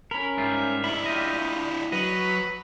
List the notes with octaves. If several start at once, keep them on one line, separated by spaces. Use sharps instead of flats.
C#4 A#4 B5
G#2 G3 F4 E5
D4 E4 B5
F4 G4 D#5
F#3 B4 D#5